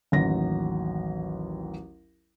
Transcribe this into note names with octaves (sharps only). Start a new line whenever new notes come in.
A1 D#2 F#3 A#6